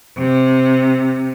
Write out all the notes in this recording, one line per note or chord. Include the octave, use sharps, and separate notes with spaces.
C3